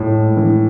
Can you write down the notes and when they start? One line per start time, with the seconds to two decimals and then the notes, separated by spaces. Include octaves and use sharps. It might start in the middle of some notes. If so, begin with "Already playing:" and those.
Already playing: A2 G#3
0.37 E3